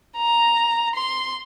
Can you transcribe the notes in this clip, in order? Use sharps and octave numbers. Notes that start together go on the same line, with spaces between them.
A#5
C6